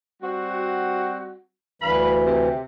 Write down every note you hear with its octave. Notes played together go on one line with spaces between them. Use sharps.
G3 C4 F#4
D2 G2 E3 F5 B5
C3